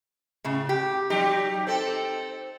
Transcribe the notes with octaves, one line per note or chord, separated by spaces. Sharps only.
A2 C#3
G4
F#3 D#4 G4
C4 A4